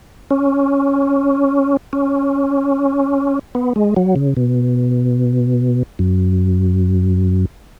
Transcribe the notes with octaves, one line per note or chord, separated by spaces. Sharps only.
C#4
C#4
B3
G#3
F#3
C#3
B2
F#2